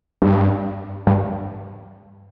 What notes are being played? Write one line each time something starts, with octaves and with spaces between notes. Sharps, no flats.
G2
G2